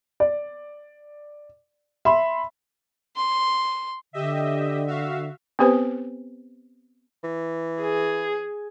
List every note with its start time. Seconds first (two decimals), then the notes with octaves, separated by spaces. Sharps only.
0.20 D5
2.05 E5 B5 C6
3.17 C6
4.13 D3 G4 D#5 E5
4.87 F#4 E5 F5
5.59 B3 C4 G4 B4 C5
7.24 E3
7.80 G#4